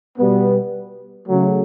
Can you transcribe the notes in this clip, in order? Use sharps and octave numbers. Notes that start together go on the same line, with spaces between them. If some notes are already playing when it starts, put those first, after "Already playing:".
B2 G3 B3
C#3 F#3 A3